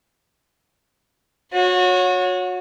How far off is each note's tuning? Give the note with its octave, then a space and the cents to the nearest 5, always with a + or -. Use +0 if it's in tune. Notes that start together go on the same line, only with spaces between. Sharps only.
F#4 -30 C#5 +0